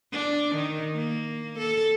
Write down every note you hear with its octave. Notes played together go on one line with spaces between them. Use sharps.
D4
D#3
A#3
A4